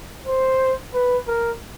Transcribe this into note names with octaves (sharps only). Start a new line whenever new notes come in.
C5
B4
A#4